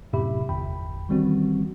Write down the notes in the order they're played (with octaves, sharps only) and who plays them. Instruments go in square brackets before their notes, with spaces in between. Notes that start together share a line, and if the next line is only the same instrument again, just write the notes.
[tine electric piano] F#2 A2 C3 G4 E5 B5
G1 E2 G5 B5
D#3 E3 G3 C4 C#4 F#4